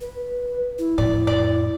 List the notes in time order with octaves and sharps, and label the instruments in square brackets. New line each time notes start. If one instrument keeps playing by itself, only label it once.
[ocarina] B4
E4
[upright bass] F2 A2 [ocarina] E4 [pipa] D5
[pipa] D5